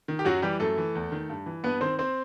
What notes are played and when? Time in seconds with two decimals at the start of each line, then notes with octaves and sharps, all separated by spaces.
0.08 D#3
0.19 G4
0.25 F#2 F#3 F#4
0.42 E3 G3 G4
0.60 F#2 A3 A4
0.77 E3
0.95 E2
1.12 D#3
1.30 G2
1.46 E3
1.64 G2 B3 B4
1.81 D#3 C4 C5
1.99 C4 C5